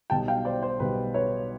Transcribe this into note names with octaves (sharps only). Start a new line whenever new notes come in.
B1 B2 G3 G5 A5
F5 G5
C5 D5
C5
B1 B2 G3 B4
B4 C#5